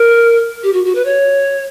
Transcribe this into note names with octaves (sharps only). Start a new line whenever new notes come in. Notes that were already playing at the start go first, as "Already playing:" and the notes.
Already playing: A#4
G4
F#4
F#4
B4
C#5